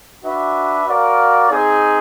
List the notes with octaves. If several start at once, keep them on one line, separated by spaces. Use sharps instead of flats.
D4 F#4 B4 E5
F#4 A#4 D5 F5
C4 D#4 G#4